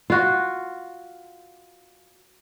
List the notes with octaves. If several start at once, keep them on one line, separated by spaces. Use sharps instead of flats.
F4 F#4